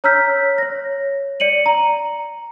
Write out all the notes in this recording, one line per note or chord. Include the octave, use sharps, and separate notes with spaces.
C#5 A#5 E6 F6 G6 B6
C#5 A#6
D5 C#7 D#7 F#7
A#5